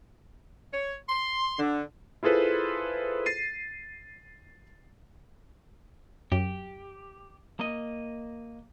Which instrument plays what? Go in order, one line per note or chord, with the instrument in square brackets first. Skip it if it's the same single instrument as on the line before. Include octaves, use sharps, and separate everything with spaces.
[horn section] C#5
C6
D3
[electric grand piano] E4 F4 G#4 A4 B4 C5
A6 C7 D#7
[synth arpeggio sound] F#2 [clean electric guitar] G4
[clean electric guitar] A#3 D#5